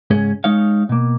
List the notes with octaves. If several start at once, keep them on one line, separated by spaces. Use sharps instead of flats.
C#2 G#2 C#4 G#4
G#3 D#4 C#5 F5
B2 A#3